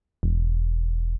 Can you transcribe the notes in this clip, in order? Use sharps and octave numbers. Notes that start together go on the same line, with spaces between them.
E1